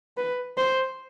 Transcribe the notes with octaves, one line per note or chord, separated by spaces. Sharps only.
B4
C5